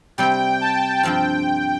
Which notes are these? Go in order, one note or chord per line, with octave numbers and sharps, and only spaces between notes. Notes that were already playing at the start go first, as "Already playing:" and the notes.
C3 G3 C4 G4 G5
A5
G2 F3 C4 F4 G5